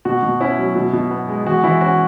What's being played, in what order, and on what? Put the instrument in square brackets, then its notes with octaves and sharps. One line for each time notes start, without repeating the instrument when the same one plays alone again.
[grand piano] B2 F#4
B2
C#4 E4
F#3
B2
B2
B3
G#3
E3 F#4
E3 E4
C#4 F#4